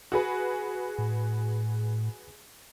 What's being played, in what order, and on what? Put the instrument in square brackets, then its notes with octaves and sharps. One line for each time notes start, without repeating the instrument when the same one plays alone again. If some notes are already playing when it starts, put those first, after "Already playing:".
[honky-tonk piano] F#4 G#4 B4
[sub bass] A2